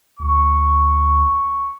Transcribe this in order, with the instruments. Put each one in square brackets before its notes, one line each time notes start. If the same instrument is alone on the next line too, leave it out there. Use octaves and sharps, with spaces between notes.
[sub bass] D2 [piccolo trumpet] C#6